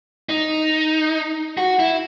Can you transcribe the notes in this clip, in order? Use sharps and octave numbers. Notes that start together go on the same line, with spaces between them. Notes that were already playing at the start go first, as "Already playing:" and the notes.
D#4
F#4
E4